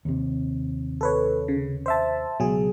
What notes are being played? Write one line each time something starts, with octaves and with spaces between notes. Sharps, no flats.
D#2 C3
A4 B4 C#5
C#3
C5 E5 A5
C#2 B2 F#3 G#4